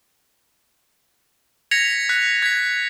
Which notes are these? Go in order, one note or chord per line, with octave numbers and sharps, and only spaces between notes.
G#6 A#6 B6 C#7 F7
F#6 B6
G#6 B6